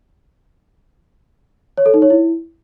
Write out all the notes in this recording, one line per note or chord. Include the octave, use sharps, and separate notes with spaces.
C#5
A4
D#4
C#5
E4